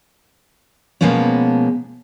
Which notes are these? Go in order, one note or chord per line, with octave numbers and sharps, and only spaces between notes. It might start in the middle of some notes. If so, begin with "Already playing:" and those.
B2 F3 G#3 A#3 B3 C#4